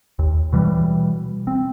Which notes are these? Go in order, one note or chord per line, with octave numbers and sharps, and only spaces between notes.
D#2
B2 E3 G3
C4